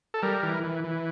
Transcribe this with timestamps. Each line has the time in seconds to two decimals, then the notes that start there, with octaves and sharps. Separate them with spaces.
0.14 A4
0.22 G3 A#4
0.43 E3
0.64 E3
0.84 E3